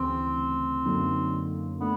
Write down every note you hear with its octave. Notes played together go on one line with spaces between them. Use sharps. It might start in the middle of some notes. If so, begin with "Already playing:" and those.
Already playing: D2 C#3 E3 C4
F#2 D3 F#3 A#3 D#4
A3 B3 D4